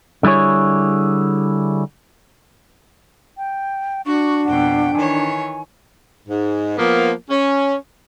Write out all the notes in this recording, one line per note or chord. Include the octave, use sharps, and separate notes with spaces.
D3 G3 E4 G#4 C#5
G5
D4 F#4 C#6
F2 B2 F#5 G5
D#3 E3 C#5 G#5
G#2
F3 A#3 B3
C#4